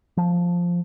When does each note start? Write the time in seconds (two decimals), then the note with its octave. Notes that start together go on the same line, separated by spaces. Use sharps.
0.17 F3